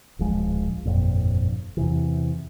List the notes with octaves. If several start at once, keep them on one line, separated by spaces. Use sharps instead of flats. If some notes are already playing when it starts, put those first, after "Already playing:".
D1 A#1 F3 G#3
G1 F2 A#2
E2 C3 E3